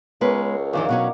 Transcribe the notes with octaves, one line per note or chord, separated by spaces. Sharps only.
C#2 G#3 B3 A#4 B4 C#5
F#2 D#3 E3 D#4 D5 F5
B2 F#3 C#4 F#5